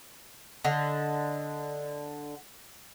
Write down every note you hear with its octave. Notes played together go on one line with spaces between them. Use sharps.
D3 D#5